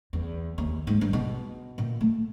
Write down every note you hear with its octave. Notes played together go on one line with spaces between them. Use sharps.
E2
D#2
G#2
G2
B2
A#2
A3